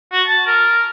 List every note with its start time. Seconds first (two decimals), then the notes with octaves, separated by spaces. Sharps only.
0.12 F#4
0.27 A5
0.47 A#4